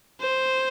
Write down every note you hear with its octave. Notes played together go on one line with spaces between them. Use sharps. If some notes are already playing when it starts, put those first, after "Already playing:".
C5